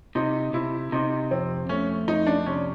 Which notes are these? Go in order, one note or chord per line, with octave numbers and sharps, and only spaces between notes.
C3 D#4
C3 E4
C3 D#4
F2 C4
A3 C#4
F2 D#4
D4
C3 C#4